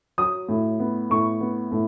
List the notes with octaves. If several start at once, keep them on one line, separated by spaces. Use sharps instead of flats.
F#3 D#6
A2
B3
A2 C#6
B3
A2